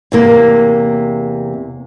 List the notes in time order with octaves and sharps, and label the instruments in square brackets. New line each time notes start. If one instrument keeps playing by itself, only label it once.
[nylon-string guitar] E2 C3 A#3